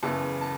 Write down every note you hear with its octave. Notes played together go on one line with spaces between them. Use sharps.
F#1 E2 C#3 E3 A5
A5